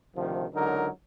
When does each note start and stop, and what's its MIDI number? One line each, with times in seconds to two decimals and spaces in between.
0.15 0.45 38
0.15 0.45 48
0.15 0.45 51
0.15 0.45 53
0.53 0.87 37
0.53 0.87 50
0.53 0.87 54
0.53 0.87 63
0.53 0.87 70